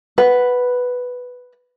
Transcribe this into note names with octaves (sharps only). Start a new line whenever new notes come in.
B4 F#5